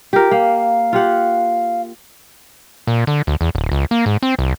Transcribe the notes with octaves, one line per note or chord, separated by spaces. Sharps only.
F4 G4 A#4
A#3 F5
F4 G4 F#5
A#2
D3
D2
E2
D1
C#2
A#3
G#2
C4
C2